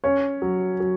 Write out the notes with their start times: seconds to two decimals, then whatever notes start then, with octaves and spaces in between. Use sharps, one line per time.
0.04 C#4 C#5
0.42 F#3
0.80 F#3